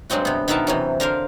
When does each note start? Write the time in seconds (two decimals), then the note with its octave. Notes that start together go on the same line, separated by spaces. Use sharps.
0.10 G2 F#3 G#3 C4 F#4
0.25 C3 B3
0.48 B2 D#3 B3 A#4 E5 A5
0.67 C3 E3 F#3
1.00 D3 A#4 C5 F5